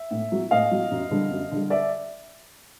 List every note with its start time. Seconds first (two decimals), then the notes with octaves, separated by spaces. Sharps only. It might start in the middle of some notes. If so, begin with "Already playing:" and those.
Already playing: E5
0.11 A2
0.32 F#3
0.51 A2 D#5 F5
0.71 F#3
0.91 F#2
1.11 D3 G3
1.31 F#2
1.51 D3 G3
1.70 D5 E5